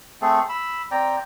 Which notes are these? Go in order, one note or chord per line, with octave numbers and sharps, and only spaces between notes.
A3 C4 G#4 A4
B5 E6
C4 D5 G5 A#5